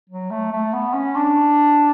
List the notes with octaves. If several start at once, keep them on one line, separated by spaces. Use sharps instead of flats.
F#3
A3
A3
B3
C#4
D4